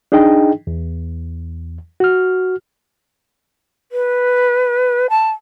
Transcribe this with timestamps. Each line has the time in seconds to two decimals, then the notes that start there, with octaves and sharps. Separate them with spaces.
0.12 D4 D#4 G#4 D#5 G5
0.67 E2
2.00 F#4 F6
3.92 B4
5.10 A5